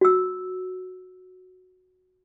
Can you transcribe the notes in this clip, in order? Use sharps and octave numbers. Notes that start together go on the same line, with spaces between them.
F#4 E6